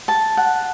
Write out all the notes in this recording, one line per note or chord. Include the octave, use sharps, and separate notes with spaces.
A5
F#5